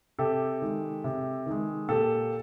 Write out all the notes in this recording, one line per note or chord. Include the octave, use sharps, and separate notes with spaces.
C3 G4 A4
D#3 G#3
C3
D#3 G#3
A#2 G4 A4